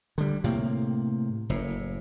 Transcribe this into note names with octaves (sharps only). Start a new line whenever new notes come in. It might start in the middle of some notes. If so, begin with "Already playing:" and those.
D3 G3
A2 C3 A#3
F#1 A2